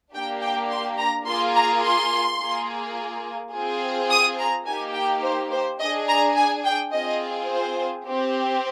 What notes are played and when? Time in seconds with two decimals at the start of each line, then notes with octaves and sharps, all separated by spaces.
0.13 A#3 D4 G4 G5
0.41 G5
0.71 C6
0.98 A#5
1.26 A#3 F4 G#4 C6
1.55 A#5
1.83 C6
2.40 A#3 F4 G#4
3.53 C4 F4 G#4
4.10 D#6
4.39 A#5
4.66 A#3 D#4 G4 G#5
4.94 G5
5.23 C5
5.51 C5
5.79 D4 G#4 D#5
6.08 A#5
6.36 G#5
6.65 G5
6.93 C4 F4 G#4 D#5
7.49 C5
8.07 C4 G4